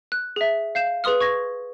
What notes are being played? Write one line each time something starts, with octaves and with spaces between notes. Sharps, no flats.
F#6
G#4 E5
F5 G6 E7
G#4 B4 C6 D#6 F6
C#6 G#6 A#6